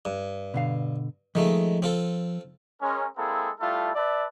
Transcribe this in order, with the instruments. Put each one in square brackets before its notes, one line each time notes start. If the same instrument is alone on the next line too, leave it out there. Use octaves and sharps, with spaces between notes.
[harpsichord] G2
[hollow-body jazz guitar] B2 D3 F5
[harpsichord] D#3 G#3 A3 [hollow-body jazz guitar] F3
[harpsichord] C4 F4 A4
[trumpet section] G#3 C#4 A#4
G#3 A#3 C4 E4 G#4 A4
G3 A3 E4 F4 A4 E5
B4 D5 E5 A5